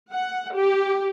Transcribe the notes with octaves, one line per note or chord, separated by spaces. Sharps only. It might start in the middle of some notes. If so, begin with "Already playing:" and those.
F#5
G4